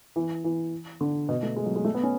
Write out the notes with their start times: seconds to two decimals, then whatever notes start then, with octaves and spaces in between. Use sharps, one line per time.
0.16 E3
0.44 E3
1.01 D3
1.29 B2
1.43 A3
1.56 G#3
1.66 F#3
1.76 G#3
1.85 A3
1.94 B3
2.03 C#4